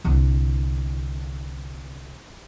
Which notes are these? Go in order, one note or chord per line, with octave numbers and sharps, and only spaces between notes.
C2 D3